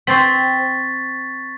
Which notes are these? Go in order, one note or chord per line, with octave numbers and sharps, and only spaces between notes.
C4 C5 C#6 A6 B6